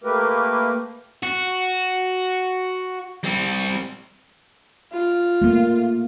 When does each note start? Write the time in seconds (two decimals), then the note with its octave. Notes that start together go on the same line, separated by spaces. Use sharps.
0.04 A3 A#3 G4 A#4 B4
1.23 F#4
3.24 G3 C4
4.93 F4
5.42 A3 A#3